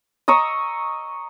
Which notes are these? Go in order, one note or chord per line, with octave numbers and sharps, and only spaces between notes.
D#5 A#5 C#6 E6